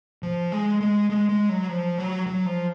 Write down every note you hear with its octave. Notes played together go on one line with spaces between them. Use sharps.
F3
G#3
G#3
G#3
G#3
F#3
F3
F#3
F#3
F3